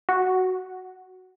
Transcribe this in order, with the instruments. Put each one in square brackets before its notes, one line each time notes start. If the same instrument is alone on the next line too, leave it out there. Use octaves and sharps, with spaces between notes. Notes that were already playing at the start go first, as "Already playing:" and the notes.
[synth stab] F#4